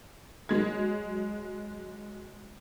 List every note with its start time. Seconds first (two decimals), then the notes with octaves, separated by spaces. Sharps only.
0.49 F#3 G#3 G#6